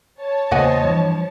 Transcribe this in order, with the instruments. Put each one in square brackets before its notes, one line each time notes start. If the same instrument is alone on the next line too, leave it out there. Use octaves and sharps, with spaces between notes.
[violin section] C#5 A5
[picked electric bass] E2 C#3 A#3 [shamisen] F#4 F#5 G#5 [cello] C5 D#5
[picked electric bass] G2 E3 [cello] F3